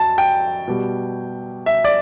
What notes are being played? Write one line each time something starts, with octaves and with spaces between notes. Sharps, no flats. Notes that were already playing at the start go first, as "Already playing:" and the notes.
Already playing: F#2 A5
G5
B2 G3
E5
D5